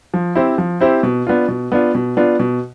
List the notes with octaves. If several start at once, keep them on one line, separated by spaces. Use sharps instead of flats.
F3
C4 E4 G4 C5
F3
C4 E4 G4 C5
B2
B3 D4 F4
B2
B3 D4 F4
B2
B3 D4 F4
B2